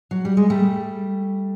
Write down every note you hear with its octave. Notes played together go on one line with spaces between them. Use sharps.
F#3
G3
G#3
G3 A3